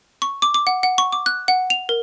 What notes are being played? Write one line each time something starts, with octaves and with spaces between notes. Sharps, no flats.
C#6
D6
D6
F#5
F#5
C#6
D6
F#6
F#5
F7
A#4